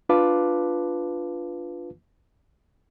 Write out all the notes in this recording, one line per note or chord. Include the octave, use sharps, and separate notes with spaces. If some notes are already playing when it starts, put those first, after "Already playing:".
D4 F4 B4 F5 A5 D6